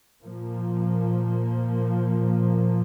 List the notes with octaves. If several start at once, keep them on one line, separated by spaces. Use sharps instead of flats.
A#2 F3 A#3